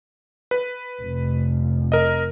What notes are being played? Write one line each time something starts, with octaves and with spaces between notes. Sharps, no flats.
B4
F1 F2
A#4 D#5